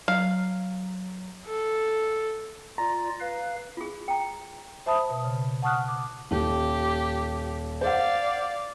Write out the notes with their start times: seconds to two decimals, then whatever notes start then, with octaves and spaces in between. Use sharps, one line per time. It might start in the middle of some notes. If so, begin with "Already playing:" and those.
0.08 F#3 F5
1.47 A4
2.78 F4 D5 A#5
3.21 B4 F5
3.77 F4 G#4
4.08 G5 A#5
4.86 C5 E5 A5 B5 D#6
5.10 B2
5.25 C#3
5.62 F#5 A5 C#6 D#6 F6 F#6
5.88 D6
6.31 D#1 G4
7.81 C5 D5 F5 F#5